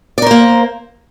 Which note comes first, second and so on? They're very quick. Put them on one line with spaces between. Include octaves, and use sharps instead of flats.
D5 A#4 C5 A#3